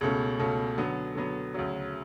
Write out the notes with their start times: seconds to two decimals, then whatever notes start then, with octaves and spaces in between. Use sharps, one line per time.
0.01 C#2 B2 A3 C#4
0.39 C#2 B2 A3 C#4
0.78 D3 F#3 B3
1.15 D3 F#3 B3
1.54 D2 C#3 F#3